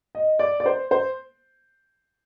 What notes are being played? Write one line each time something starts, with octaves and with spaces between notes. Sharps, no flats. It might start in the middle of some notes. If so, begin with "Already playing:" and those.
D#5
D5
D5
C5
C5